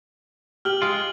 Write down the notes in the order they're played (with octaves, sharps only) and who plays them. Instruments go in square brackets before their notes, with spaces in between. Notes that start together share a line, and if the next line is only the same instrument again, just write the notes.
[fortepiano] G4 [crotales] F6 F#7
[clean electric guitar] G#3 F4